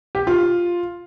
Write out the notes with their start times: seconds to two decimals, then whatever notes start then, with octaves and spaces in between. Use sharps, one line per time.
0.15 G4
0.27 F4